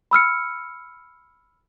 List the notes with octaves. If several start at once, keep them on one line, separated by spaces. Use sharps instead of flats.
B5 E6 F6 C#7